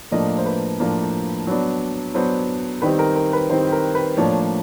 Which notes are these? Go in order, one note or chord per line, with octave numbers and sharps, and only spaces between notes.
A2 F3 A#3 D4 D#5
C5
B4
A2 F3 A#3 D4
F#3 B3 D4
F#3 B3 D4 C5
D#3 G3 C4 D#4 B4
A#4
A#4
B4
D#3 G3 C4 D#4 C5
A#4
B4
A2 F3 A#3 D4 C#5
C#5